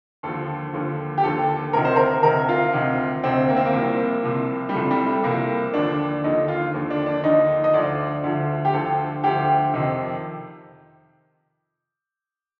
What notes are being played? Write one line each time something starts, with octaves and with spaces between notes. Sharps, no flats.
D#2 D3 F3 A4
D#2 D3 F3
G4
D#2 D3 F3 A4
D2 C3 D#3 A#4
C5
A#4
D2 C3 D#3 A#4
F4
D2 C3 D#3
D2 C3 D#3 C4
A#3
C4
A#3
C2 C3 F3
C2 C3 F3
G3
C2 C3 F3 A3
G3
A3
C2 C3 F3 A#3
D#2 D3 F3 D4
D#2 D3 F3 D#4
F4
D#2 D3 F3
D4
D4
D#2 D3 F3 D#4
D#5
D2 D3 F3 D5
D2 D3 F3
G4
D2 D3 F3 A4
D2 D3 F3 G4
F2 C3 D#3